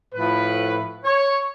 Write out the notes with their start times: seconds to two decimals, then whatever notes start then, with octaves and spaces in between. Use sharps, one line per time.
0.14 A2 F3 B4
1.04 C#5